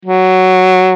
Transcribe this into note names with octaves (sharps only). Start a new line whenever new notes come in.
F#3